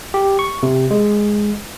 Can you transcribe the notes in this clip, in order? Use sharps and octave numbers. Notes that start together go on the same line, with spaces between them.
G4
C#6
C3
G#3